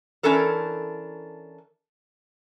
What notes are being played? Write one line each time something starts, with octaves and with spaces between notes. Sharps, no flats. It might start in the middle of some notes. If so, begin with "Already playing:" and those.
E3 C#4 D4 A4 A#4